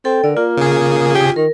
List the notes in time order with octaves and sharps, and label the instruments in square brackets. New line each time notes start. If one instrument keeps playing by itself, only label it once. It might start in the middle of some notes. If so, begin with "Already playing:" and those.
[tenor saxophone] C4 [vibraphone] A4 G5
[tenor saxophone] D3 [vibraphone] A#4 D5
[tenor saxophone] A#3 [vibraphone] F4
[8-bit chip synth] C#3 G#4
[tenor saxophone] G4
[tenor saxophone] D#3 [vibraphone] A#4